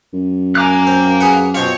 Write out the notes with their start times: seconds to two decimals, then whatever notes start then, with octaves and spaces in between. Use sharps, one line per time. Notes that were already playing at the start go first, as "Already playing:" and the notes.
0.13 F#2
0.55 F5 G#5 A#5 D6 F#6
0.87 C4
1.21 G#4 B4 F#5
1.55 B2 C4 F4 C#5